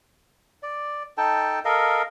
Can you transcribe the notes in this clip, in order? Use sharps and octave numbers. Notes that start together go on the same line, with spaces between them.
D5
D#4 A4 G5 A5
A4 A#4 D#5 F5